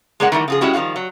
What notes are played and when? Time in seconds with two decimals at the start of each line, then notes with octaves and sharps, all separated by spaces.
0.20 G#3 A#3 G#4 D5 F#5
0.32 D#3 E3 G3 A3
0.48 C#3 F3 G#4
0.61 G3 G#3 C#4 E4 F#4 G4
0.73 D#3 F3 G3 F#4 F5
0.96 F#3